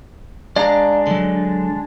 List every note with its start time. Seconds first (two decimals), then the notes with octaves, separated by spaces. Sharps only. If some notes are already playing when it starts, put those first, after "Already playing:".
0.56 G#3 D4 D5 F5 A#5
1.07 D3 F#3